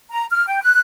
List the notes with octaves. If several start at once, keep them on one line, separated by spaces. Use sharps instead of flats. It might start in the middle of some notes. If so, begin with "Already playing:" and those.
A#5
F6
G5
F#6